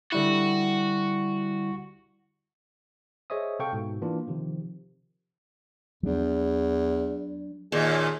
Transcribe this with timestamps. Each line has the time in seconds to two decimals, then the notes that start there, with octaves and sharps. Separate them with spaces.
0.12 D3 G3 E4 F#4
3.30 G#4 C5 C#5 D#5 E5 D#6
3.59 C3 A4 F5 G5 C#6
3.73 G#2 B2
4.02 E3 A#3 D4 F4
4.27 C3 D#3 F3
6.03 E2 F#3 D4
7.72 D#2 A#2 G#4